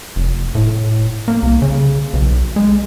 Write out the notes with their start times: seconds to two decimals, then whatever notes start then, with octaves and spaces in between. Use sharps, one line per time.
0.16 F1
0.55 A2
1.28 A#3
1.43 C2
1.62 C#3
2.13 B1
2.56 G#3